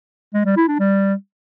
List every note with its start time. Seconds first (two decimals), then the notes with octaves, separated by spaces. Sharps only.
0.34 G#3
0.45 G3
0.57 E4
0.68 D4
0.79 G3